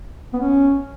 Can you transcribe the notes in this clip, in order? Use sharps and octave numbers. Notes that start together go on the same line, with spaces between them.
B3
C#4